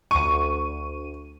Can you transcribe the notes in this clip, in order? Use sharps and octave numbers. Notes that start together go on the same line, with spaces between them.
D2 C#6 D#7